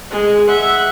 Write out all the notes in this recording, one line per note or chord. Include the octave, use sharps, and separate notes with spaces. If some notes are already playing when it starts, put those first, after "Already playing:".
G#3
E5 F#5